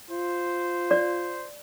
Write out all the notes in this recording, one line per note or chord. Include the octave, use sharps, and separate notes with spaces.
F4 C5
D5